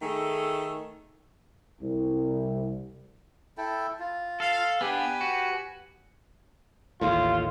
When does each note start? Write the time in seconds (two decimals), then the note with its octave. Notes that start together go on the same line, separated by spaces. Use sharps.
0.02 D#3 A3 G#4 A4
1.80 C2
3.58 E4 A4 G5
4.00 F4
4.40 A4 F5
4.81 B3 D4 G4 B4 G#5
5.21 F#4
7.01 A1 D#2 A2 F4